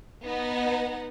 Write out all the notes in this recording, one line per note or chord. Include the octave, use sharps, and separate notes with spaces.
B3 D#4 F#5